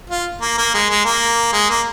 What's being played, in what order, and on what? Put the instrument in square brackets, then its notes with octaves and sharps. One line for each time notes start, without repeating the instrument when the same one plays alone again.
[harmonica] F4
A#3
A#3
G#3
G#3
A#3
G#3
A#3